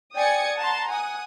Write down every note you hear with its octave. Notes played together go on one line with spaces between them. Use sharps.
D5 G5 G#5 D#6 G#6 C#7
F#5 A5 A#5 C6
F#5 G#5 D#6